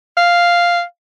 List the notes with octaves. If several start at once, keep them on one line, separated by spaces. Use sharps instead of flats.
F5